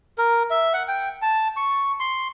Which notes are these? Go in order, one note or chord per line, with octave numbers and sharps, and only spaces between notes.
A#4
E5
F#5
G5
A5
C#6
C6